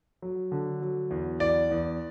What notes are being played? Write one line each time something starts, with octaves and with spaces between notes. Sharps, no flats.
F#3
D3
F#3
E2
E2 D5
E2